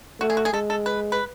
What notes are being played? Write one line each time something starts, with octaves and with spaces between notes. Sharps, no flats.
A3 F#4
G#4
F#4
G#4
G#3 A4
A4
B4
B4